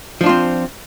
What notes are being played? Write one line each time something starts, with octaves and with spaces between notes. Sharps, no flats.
F3 C4 D4 F4